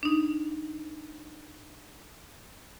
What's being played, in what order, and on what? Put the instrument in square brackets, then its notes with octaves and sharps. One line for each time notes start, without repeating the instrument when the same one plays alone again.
[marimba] D4 D#4